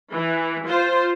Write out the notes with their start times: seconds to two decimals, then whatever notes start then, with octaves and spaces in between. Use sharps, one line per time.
0.12 E3
0.67 F4 C5